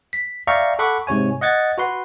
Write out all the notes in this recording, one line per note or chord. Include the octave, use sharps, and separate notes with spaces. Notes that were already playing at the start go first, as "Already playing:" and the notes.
B6
D5 E5 F5 G5 A#5 C#6
A4 F#5 B5 C#6 D6
G#2 C3 C#5 G#5
D#5 F#5 G#6 A6
F#4 B4 C6